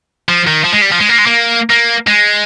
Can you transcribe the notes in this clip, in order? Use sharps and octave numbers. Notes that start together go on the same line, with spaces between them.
F3
D#3
F3
G#3
G3
F3
G#3
A#3
G#3
A#3
A#3
G#3